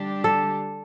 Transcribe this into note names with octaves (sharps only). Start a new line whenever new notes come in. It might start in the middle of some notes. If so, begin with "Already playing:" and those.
Already playing: D3 G3 D4 G4
A4